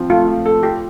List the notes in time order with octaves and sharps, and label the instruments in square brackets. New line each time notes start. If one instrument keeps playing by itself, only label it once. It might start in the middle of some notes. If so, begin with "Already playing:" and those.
Already playing: [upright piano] F3 C4
[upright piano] A3 [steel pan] F4
[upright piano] F3
A4
[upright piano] F4 [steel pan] G4